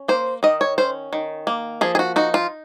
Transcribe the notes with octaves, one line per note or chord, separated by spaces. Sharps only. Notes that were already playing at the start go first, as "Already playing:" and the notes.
Already playing: C#4
A#3 C5
D#3 D#5
C#5
C#4 C5
D#3
A#3
F3 G#4
G#4
F#4
D#4 F#4
F4